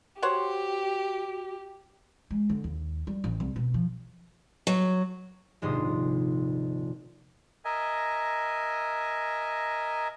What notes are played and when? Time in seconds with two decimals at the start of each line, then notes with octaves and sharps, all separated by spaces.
0.22 F#4 G4 C5 C#5 F#5
2.31 G#3
2.50 D3
2.64 D#2
3.07 G3
3.24 A1
3.40 C2
3.56 B2
3.74 F3
4.67 F#3
5.62 D#1 A#1 G#2 C3 C6 D#6
7.65 A#4 D#5 E5 G#5